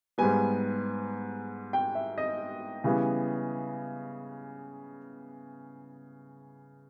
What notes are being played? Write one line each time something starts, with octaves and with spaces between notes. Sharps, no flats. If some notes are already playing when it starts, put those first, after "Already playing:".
G#2 G3 B3 G#5
G5
E5
D#5
C#3 E3 G3 B3